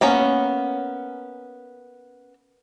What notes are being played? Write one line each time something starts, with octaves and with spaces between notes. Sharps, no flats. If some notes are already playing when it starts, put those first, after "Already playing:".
A#3 B3 C#4